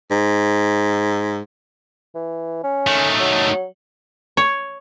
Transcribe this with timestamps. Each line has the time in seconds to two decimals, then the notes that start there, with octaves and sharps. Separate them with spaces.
0.11 G#2
2.15 E3
2.64 C#4
2.87 D#3 A3
3.20 F#3
4.37 C#5